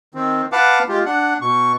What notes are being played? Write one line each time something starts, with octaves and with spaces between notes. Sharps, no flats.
D#3 C4
B4 F5 F#5 A5 D6
G#3 F4 G4
D4 F#5
B2 C#6